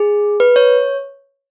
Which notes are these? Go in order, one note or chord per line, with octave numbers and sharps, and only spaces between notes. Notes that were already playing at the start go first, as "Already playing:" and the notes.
Already playing: G#4
B4
C#5